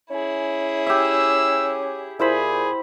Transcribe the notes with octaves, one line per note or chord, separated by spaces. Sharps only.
C#4 E4 G#4
G4 E5 E6
A#2 E4 G#4 C5 B5